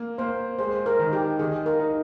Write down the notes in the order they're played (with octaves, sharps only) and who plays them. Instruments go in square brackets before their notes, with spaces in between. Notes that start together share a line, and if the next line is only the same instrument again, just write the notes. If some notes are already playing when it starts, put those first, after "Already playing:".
Already playing: [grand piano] A#3
[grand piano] A#3 [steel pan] C5
[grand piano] G#3 [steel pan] C5
[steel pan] A#4
[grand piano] D#3
[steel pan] G4
[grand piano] D#3 [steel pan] G#4
[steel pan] A#4
[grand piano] D#4